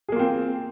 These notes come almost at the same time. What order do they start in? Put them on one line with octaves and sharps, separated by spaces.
G#4 A#3 F4 C4